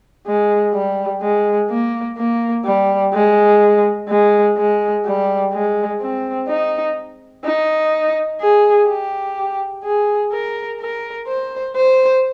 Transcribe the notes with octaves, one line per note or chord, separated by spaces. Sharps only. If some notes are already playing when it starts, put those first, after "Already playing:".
G#3
G3
G#3
A#3
A#3
G3
G#3
G#3
G#3
G3
G#3
C4
D#4
D#4
G#4
G4
G#4
A#4
A#4
C5
C5